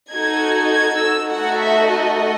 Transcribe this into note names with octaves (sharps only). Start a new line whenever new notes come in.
D#4 F#4 A4 G#6
G#6
E6
A3 D#4 F#4 A4 F#5
E5
D#5